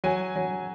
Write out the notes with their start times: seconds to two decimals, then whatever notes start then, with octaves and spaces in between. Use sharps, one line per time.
0.04 F#3 G#5
0.36 F#3